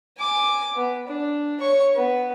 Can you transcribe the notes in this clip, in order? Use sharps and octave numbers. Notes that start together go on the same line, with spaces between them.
G#5 D6
B3
D4
C#5 C#6
B3